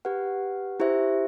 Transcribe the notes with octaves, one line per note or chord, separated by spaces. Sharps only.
G4 B4 F#5
E4 G4 C5 E5